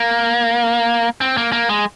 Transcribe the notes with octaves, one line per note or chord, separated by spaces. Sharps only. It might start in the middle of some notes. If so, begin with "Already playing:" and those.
Already playing: A#3
C4
A#3
A#3
G#3